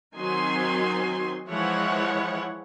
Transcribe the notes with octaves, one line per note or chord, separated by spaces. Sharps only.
D#3 F#3 C4 D#4 G#5 C6
E3 F3 G#3 E4 C#5 F#5